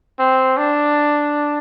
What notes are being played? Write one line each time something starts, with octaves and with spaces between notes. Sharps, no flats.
C4
D4